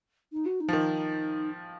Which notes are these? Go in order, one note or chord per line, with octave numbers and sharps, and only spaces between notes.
D#4
F#4
D#4
F3
D#3